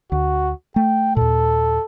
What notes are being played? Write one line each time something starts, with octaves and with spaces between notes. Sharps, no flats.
D2 F#4
A3 G5
D#2 A#2 A4